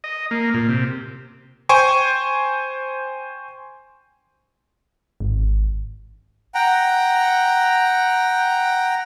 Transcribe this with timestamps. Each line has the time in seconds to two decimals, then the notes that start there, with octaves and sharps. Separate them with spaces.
0.04 D#5
0.31 A#3
0.54 A#2
0.69 C3
1.69 C5 G5 G#5 C#6
5.20 G#1
6.55 F#5 G5 A#5